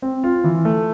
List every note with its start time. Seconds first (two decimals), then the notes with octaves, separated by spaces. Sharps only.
0.02 C4
0.24 F4
0.44 E3
0.65 A3